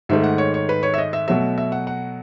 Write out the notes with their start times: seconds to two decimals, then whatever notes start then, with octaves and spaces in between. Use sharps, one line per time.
0.09 G#2 D#3 A3 E5
0.23 F#5
0.38 C#5
0.54 C#5
0.69 B4
0.83 C#5
0.94 E5
0.98 D#5
1.13 E5
1.28 B2 F#3 A3 E5
1.58 E5
1.72 F#5
1.87 F#5